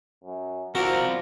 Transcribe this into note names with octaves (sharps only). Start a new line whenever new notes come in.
F#2
F3 C4 F#4 A#4 D5